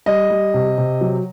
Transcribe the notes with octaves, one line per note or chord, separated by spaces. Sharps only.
G3 D#5
G3
C3
C3
F#3